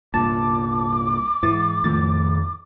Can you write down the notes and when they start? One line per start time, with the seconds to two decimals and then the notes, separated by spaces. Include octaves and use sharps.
0.14 C2 G2 A#2 A5 D6
1.43 G#2 E3 A6
1.84 F2 A2 D#3 A3 A6